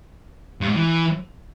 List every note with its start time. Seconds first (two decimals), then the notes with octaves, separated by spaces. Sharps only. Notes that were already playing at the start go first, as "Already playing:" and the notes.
0.61 G2
0.68 G#2
0.76 E3